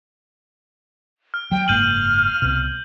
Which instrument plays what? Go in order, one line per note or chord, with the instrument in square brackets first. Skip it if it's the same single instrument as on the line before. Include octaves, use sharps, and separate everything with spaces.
[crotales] F6
[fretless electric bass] F#3 G3 [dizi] G5
[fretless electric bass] F#1 G#2 A#3 [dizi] F6 [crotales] G6 D#7 F#7
[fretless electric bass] C2 B2